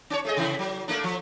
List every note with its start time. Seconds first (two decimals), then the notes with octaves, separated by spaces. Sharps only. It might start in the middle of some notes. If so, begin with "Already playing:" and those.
0.10 C#4 C#5
0.25 A3 G#4 D#5
0.37 C3 E3 E4
0.59 F#3
0.88 A3 A#3 D4
1.04 F3